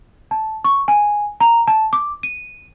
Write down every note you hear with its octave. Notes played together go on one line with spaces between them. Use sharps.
A5
C#6
G#5
A#5
A5
D6
D#7